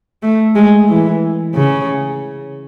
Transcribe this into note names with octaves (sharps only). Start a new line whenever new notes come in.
A3
G#3
E3
C#3